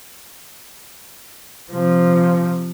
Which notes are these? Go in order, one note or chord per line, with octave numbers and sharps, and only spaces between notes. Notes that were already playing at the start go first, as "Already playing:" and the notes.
C3 F3